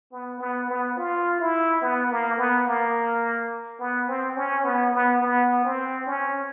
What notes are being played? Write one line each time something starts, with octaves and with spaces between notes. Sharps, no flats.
B3
B3
B3
F4
E4
B3
A#3
B3
A#3
B3
C4
C#4
B3
B3
B3
C4
C#4